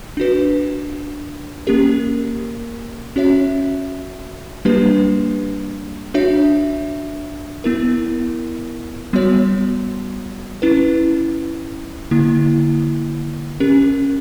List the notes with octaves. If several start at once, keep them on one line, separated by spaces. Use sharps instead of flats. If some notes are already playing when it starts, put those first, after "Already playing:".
D4 F#4 B4
A#3 C#4 G4 A#4
C#4 F#4 C#5 E5
G3 A#3 D4 G4 B4
D4 F#4 C#5 E5
B3 E4 A#4
G3 B3 F#4 C#5
C#4 E4 B4
D3 A#3 E4
C#4 G4 A#4